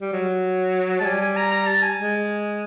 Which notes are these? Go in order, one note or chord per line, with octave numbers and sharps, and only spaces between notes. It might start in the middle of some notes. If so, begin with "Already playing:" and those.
G3
F#3
G#3 A5
G3 G#5
G#5
A#5
A#5
A5
G#5
G#3